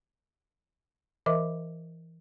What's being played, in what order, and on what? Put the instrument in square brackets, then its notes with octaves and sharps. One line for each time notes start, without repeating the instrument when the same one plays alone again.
[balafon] E3 A#4 D#5 E5 D6